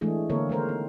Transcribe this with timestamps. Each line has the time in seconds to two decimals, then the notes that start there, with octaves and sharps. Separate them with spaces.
0.01 E3 G#3 A3 D4 G#4
0.30 D3 A#3 C4 A4 A#4 C#5
0.49 D#3 G#3 A#4 C5
0.69 C4